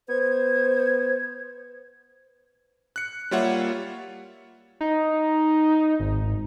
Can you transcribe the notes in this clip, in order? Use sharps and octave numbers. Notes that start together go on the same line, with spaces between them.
B3 C5 G#6
F#6 C#7
G3 A#3 F4 C#5 E5 F#5
D#4
G#1